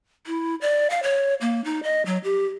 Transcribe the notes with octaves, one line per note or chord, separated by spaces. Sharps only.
E4
D5
F5
C#5
A#3
D#4
D#5
F#3
G4